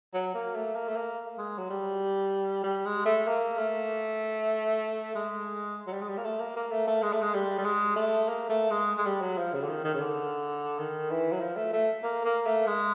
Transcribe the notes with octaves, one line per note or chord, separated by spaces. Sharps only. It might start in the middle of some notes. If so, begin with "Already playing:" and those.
F#3
A#3
A3
A#3
A3
A#3
G#3
F#3
G3
G3
G#3
A3
A#3
A3
G#3
F#3
G3
G#3
G3
A#3
A3
A#3
A#3
A3
A3
G#3
A3
G#3
G3
G3
G#3
A3
A#3
A3
G#3
G#3
G3
F#3
F3
C#3
D3
D#3
D#3
C#3
D3
D#3
E3
F#3
F3
A3
A3
A#3
A#3
A3
G#3